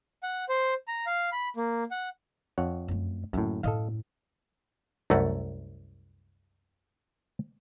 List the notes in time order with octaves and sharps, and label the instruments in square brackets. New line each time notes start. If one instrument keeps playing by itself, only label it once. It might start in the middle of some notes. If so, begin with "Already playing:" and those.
[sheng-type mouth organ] F#5
C5
A#5
F5
B5
A#3
F#5
[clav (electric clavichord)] F2 C#5 F#5
[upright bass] F#2 A3
[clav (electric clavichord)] F#2 A2 [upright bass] D3 A#3
[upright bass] F#2 A2 [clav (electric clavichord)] A4 D#5 F5
[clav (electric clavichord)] C2 F#2 A3 F#5